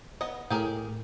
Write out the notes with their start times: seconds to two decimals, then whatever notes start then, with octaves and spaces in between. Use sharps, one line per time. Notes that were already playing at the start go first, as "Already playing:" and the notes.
0.21 B3 D#5
0.50 A2 G4 G#4 A#4